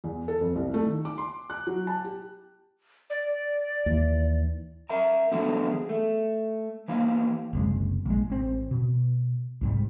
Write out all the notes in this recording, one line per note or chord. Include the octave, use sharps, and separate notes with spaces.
E2
A4
F2
C2
A3
D#3
D6
C6
F#6
F#3
A5
G4
D5
D#2 E3
A#4 E5 A#5
D3 E3 F#3 G3 A3 B3
G#4
A3
E3 A#3 D#4
F#1 C2 G#3
A#1 G#3
A1 C4
B2
C2 G#2 G3